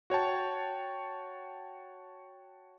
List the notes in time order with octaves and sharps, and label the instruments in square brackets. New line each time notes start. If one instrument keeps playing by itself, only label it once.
[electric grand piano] F#4 C#5 G5 A5